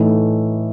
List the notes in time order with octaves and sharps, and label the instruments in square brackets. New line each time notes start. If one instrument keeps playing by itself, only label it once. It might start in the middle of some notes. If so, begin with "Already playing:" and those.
Already playing: [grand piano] A2 E3 A3 D#4